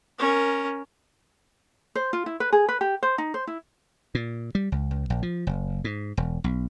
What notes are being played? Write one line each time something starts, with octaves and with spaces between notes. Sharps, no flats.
C#4 A#4
C5
F4
E4
B4
G#4
B4
G4
C5
D#4
C5
E4
A#2
G3
C#2
C#2
A#1
F3
F#1
G#2
E1
B1